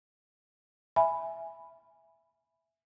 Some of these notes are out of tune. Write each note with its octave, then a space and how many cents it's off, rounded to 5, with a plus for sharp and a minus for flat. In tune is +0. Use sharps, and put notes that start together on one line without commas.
E5 +0 G#5 +0 B5 +0